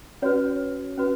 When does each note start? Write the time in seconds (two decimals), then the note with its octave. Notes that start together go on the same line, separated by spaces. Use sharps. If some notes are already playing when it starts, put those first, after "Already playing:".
0.22 C#4 F#4 B4 C#5
0.97 C#4 F#4 B4